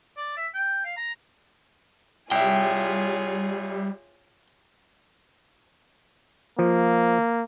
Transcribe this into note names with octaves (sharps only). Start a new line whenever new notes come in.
D5
E5
G5
F5
A#5
C2 G3 F4 G#4 C#5 E5 G5
F3 A#3